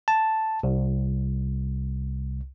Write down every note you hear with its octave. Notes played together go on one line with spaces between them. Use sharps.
A5
C2